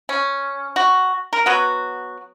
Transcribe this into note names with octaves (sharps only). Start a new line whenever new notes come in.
C#4
F#4
A#4
F#3 B3 F#4